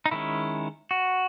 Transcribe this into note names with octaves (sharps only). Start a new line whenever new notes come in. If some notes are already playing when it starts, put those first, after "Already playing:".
D#4
D#3 G#3 C#4 E4
F#4